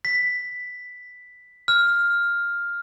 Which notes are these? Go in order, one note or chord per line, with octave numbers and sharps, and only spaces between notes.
B6
F6